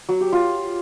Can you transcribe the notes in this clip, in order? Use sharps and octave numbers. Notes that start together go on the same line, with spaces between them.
F#3
G4
F4